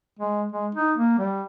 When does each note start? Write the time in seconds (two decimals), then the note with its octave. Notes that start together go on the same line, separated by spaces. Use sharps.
0.19 G#3
0.52 G#3
0.75 D#4
0.97 A#3
1.18 G3